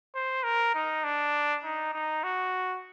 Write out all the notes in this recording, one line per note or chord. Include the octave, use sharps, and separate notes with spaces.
C5
A#4
D#4
D4
D#4
D#4
F#4